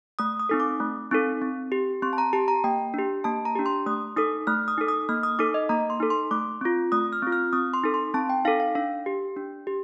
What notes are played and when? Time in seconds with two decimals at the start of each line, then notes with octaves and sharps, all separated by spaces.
0.19 A3 D#6
0.40 D#6
0.49 C4 D#4 A4
0.60 D6
0.80 A3
1.11 C4 D#4 A4
1.42 C4
1.72 G4
2.02 C4 C6
2.13 A5
2.18 A#5
2.33 G4 A5
2.48 A#5
2.64 A#3 G5
2.94 D4 G4
3.24 A#3 A5
3.45 A#5
3.56 D4 G4
3.66 C6
3.86 A3 D#6
4.16 D#4 A4 D#6
4.47 A3 F6
4.68 D#6
4.78 D#4 A4
4.88 D#6
5.09 A#3 F6
5.23 D#6
5.39 D#4 A4 D6
5.54 D#5
5.69 A#3 A#5
5.90 C6
6.00 D#4 A4
6.10 C6
6.31 A3 D6
6.61 C4 F4
6.92 A3 D#6
7.13 F6
7.22 C4 F4
7.32 F6
7.53 C4 D#6
7.74 C6
7.84 D#4 A4
7.94 C6
8.14 C4 A5
8.29 G5
8.45 D#4 A4 F5
8.60 F5
8.75 D4 F5
9.06 G4
9.36 D4
9.67 G4